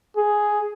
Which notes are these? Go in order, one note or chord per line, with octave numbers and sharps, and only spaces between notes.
G#4